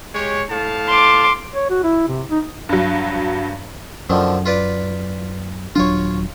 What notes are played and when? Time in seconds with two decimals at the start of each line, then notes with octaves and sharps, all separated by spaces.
0.15 G#3 G4 C#5
0.51 A2 F5 A5
0.88 C6 D6
1.55 C#5
1.70 F#4
1.83 E4
2.08 C3
2.31 D#4
2.69 G2 F#3
4.10 F#2 D3 D#3 F3
4.46 F4 B4 D5
5.76 D#1 F#3 D4 F4 C#5